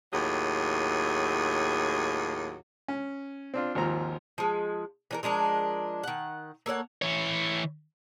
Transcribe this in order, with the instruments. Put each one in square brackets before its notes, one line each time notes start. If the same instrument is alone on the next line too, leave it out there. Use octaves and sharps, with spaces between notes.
[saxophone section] D#2 A2 F#3 G#4
[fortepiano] C#4
C4 D4 F4
G#1 D#2 F3 A#5
[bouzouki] F3 G#3
E3 D4 A#4
F3 G#3 D4 A#4
D#3 F#5
A#3 A4 C#5 F#5
[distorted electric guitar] E3 C#5